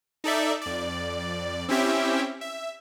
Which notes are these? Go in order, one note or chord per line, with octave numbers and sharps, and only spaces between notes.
D#4 A4 D5 E5
F2 D5
C4 C#4 E4 G4 E5 G5
E5